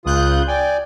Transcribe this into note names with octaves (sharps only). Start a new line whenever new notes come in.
C#2 C#3 F4 D#6 F#6 G6
D5 G5 G#5